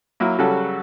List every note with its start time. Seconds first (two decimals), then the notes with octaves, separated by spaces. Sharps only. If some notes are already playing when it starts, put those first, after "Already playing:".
0.20 F#3 A#3 E4
0.38 C#3 F#3 G3 F#4 A4